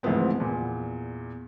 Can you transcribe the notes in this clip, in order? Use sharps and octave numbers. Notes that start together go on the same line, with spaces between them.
D2 G#2 E3 F3 B3 C4
E2 A#2